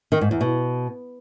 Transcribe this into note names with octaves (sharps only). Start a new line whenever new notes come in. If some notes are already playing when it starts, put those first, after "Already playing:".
D#3
G#2
E2
B2